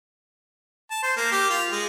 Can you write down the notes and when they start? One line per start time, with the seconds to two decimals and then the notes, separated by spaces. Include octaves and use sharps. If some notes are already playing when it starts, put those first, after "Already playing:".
0.90 A5
1.03 C5
1.17 A#3
1.31 G4
1.50 F4
1.72 G#3